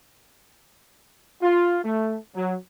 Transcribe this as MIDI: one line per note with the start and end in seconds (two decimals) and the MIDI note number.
1.41 1.79 65
1.84 2.16 57
2.35 2.55 54